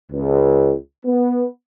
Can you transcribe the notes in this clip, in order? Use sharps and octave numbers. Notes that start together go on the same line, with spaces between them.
C#2
B3